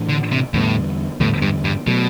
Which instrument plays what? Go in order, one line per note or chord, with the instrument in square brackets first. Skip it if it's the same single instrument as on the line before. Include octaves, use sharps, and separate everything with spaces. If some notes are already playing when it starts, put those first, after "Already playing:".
Already playing: [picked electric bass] A2 E3 A3 D4
[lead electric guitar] D3
C3
[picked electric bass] E2 D3 G3 B3 [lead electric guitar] A2
[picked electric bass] E2 D3 G3 B3 [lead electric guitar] A2
[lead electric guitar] G2
G2
[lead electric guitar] B2 [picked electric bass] F#3 A3